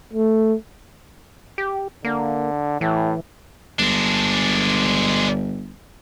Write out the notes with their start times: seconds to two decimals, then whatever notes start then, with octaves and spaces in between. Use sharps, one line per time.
0.13 A3
1.58 G4
2.05 D3 A#3
2.81 A2 E3
3.79 G1 G#3 D4